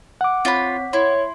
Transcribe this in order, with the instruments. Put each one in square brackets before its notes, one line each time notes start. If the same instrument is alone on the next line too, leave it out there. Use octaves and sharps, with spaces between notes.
[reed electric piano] F#5 D6
[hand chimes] C4 C#5 B6 [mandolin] F4 B5
[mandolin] E4 [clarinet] C#5 [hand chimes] C6